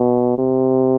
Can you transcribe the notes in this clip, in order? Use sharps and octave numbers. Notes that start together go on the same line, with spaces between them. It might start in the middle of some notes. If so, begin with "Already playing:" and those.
Already playing: B2
C3